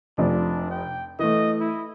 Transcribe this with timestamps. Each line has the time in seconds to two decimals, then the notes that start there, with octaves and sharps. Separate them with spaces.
0.18 F1 F3 D4 D5
0.71 G5
1.19 E3 A3 D#5
1.60 E4